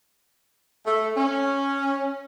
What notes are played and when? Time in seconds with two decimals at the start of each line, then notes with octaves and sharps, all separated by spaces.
0.86 A3
1.17 C#4